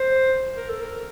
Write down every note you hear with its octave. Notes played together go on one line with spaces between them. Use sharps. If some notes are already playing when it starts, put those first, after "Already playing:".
Already playing: C5
A#4
A4
A#4